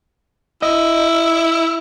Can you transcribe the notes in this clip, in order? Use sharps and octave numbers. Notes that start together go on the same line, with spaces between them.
E4 D#5